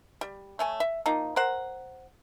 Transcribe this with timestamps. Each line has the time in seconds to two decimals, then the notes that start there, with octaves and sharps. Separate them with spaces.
0.21 G3
0.59 A3 C#5 G#5
0.80 E5
1.06 F3 A#3 D#4
1.36 A#4 C5 F#5